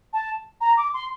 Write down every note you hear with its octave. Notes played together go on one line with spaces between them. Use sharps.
A5
A#5
D6
C6